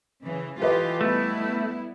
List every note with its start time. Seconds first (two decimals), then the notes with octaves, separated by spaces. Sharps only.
0.22 C#3 E3
0.60 E3 F4 G4 A4 B4 D#5
1.01 G3 A3 B3 E4